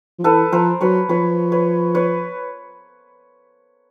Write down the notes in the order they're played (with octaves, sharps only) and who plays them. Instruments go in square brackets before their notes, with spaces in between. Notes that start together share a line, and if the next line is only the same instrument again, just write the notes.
[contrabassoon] F3
[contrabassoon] E3 [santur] A4 B4
[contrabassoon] F3 [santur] A#4 C5
[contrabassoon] F#3 [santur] B4 C#5
[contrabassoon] F3 [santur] B4 C#5
[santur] B4 C#5
B4 C#5